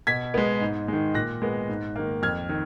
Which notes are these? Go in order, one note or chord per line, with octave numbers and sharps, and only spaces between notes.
B2 G#6 B6
G#3 B3
G#2
D#3 G#3
A#2 F#6 A#6
G#3 B3
G#2
D#3 A#3
F2 F6 G#6
D#3